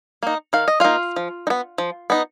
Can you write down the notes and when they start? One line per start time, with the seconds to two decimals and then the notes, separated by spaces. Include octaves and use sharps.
0.23 A#3 D#4
0.53 D#3 F5
0.68 D#5
0.80 A#3 D#4 F4 F5
1.16 F3
1.47 D#4
1.50 B3
1.78 F3
2.10 B3 D#4